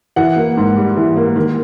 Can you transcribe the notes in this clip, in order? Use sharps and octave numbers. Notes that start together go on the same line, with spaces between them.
E3 F#5
A#3
G#2
G3
E3
A#3
D#3